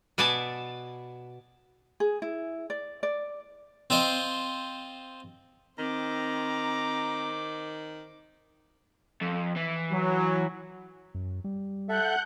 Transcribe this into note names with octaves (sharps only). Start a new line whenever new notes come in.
B2 B3 D5 G#5 A5
G#4
E4
D5
D5
C4 F4 C5 D#5
D#3 C4 C5 A#5 D6
F2
E3
F#3
F#2
G3
A4 E5 F#5 F#6 G6